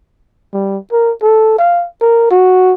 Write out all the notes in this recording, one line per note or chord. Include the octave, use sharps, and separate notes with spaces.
G3
A#4
A4
F5
A#4
F#4